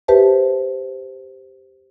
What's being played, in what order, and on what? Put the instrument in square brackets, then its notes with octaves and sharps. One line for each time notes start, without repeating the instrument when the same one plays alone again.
[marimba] G4 B4 C5 E5 A5